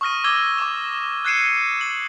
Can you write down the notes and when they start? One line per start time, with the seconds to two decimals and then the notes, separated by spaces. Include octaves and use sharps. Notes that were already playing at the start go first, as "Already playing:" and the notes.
0.01 C#6 D#6 F6 A#6 D#7
0.24 D6 E6 G#6 A#6 G7
0.58 C#6 D6 E7
1.25 F#6 G#6 C7 C#7 D#7 E7
1.81 F#7